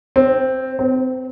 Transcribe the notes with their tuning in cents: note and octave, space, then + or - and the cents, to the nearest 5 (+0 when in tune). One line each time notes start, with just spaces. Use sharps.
C4 +0
C4 -25